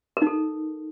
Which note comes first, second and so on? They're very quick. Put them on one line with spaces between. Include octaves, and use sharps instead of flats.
A#4 D#4 A4